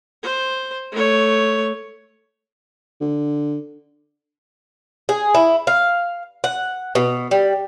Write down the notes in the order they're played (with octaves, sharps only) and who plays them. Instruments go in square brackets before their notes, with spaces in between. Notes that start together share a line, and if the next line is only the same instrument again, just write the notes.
[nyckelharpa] C5
A3 C#5
[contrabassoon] D3
[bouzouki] G#4
E4
F5
F#5
B2
G3